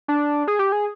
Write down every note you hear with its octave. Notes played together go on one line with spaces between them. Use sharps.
D4
G#4
G4
G#4